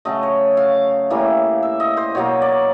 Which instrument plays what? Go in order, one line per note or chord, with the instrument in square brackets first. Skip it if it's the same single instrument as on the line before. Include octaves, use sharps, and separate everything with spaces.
[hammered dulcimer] C#3 F#3 A3 D#5
C#5
F5
A2 E3 G3 A#3
E5
D#5
C5
B2 F#3 A#3 C#5
D5